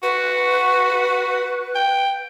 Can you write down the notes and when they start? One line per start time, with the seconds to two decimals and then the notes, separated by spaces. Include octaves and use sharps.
0.03 F#4 B4
1.75 G5